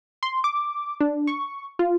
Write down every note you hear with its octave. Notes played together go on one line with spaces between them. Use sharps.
C6
D6
D4
C#6
F4